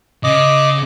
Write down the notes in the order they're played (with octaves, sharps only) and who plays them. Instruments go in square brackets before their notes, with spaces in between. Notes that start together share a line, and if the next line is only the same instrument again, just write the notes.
[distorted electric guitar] C#3 [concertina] D#5 D6